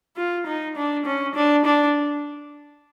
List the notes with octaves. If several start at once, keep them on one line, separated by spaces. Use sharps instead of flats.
F4
D#4
D4
C#4
D4
D4